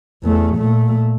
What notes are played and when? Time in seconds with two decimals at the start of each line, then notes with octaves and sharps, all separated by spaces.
0.23 E2 A3
0.56 A#2 A3